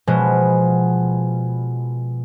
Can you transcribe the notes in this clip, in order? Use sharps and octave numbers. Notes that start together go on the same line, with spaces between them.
B2 F3 G#3 B3